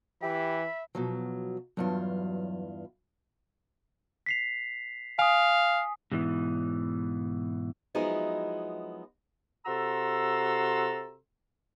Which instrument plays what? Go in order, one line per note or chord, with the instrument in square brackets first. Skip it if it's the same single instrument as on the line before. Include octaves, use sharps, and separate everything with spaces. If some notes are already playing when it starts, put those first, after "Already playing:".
[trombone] E3 [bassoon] G4 [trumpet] E5 [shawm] B5
[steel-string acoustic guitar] B2 F3 F#3
[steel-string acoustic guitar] E2 G2 F4 [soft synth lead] F#3
[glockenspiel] B6 C7 F7
[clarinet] F5 [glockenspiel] G#5 D#6
[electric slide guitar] G#2 B2 E3
[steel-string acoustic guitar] F3 F#3 G#3 B3 D#4 E4
[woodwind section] C3 F#4 A4 A#5 C6 E6